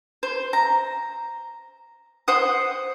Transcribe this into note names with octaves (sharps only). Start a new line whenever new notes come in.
C5
A#5
C5 F#5 D#6